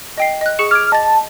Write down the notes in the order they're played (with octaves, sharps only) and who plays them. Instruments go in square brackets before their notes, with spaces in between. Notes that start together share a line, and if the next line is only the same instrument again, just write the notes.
[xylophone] D#5 G5 C7
D#5 F#6
[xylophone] G#4 C#6 E7 [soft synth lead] C#7
[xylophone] D6 G#6 D7 [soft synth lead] F6
[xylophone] D#5 A6 [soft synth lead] A5